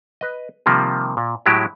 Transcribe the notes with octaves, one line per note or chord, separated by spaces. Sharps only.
B4 D#5
C3 D#3 F3 G3 A#3
A#2
A2 F#3 G#3 E4 G4